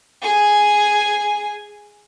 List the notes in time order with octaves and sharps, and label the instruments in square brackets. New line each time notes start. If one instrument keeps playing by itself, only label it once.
[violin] G#4 G#5